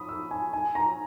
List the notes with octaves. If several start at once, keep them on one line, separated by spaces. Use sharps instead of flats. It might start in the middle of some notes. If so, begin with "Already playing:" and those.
Already playing: B5 D#6
E6
G#5
G#5
A#5